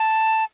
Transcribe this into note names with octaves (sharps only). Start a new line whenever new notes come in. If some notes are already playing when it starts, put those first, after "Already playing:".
Already playing: A5